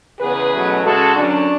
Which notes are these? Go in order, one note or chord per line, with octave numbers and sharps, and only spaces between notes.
E2 C#3 E3 B3 G#4 B4
E2 B2 F#3 A3 C#4
C#3 G#3 C#4 F#4 A4
F#2 D3 F#3 C#4 D4